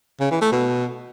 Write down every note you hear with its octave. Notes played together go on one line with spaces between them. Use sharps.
C#3
E3
A3
B2